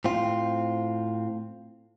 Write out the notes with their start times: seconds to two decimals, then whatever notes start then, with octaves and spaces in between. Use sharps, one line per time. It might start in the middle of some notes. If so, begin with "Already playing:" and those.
0.04 A2 C4 F4